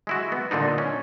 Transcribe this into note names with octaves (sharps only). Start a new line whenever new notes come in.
G#3 E4 F#4
B3
A#2 D3 D4 D#4
C#4